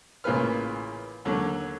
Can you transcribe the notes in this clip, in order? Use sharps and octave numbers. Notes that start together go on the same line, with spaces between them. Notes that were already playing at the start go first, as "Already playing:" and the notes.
A1 A#2 C#3 B4 F6
D#2 D3 F#3